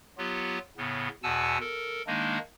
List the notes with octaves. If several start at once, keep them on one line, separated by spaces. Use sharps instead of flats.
F#3 B3 F4 G4
A2 C#3 B3
E2 B2 F#5 G#5 A5 E6
A4 A#4
D#3 G#3 A#3 D4 D#4